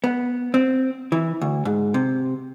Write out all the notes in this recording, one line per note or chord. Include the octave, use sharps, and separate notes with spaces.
B3
C4
E3
D2
G#2
C3